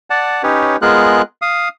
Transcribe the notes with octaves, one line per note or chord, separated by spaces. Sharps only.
D5 F#5 A5
C#4 D#4 G4 B4 C#5
G#3 B3 F4 G#4 A#4 F#6
F5 D#6